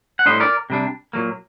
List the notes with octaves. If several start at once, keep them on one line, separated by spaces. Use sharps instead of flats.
F#5
A2 G3 D4 C5 D#5
A#4 D5
C3 G3 D4
A#2 F#3 A#3